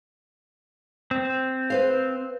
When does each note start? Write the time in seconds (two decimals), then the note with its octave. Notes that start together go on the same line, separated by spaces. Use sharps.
1.11 C4
1.70 B4 C5 F5